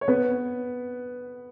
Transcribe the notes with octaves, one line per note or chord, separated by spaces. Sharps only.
C#5
B3 B4